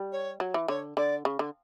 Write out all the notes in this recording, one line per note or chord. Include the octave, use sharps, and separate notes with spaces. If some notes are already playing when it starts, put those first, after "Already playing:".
Already playing: G3
C#5
F#3
E3
D3 C#5
D3 D5
C#3
D3